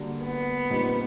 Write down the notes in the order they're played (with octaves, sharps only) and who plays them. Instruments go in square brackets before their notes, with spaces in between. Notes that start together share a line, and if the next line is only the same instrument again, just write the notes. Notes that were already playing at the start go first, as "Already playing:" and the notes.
Already playing: [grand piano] D3 G3 A#3 D4 F#4
[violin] B3
[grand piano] A#2 G3 C4 D#4